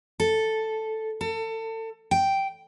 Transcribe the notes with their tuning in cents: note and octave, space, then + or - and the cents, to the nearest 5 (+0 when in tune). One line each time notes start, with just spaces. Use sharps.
A4 +0
A4 +30
G5 -5